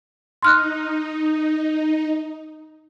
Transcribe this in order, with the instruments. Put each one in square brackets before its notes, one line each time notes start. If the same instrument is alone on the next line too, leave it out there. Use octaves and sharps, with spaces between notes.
[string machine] D#4 [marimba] C6 F6 F#6